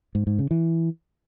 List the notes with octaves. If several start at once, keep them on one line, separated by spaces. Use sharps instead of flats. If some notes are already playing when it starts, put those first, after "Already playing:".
G#2
G#2
C#3
E3